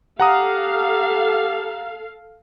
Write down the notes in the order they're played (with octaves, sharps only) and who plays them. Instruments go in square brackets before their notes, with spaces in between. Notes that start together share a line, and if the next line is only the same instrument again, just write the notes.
[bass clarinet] G4 [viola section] A4 F5 [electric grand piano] F#5 A#5 D#6